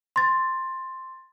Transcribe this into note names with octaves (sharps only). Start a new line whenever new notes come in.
C6 A6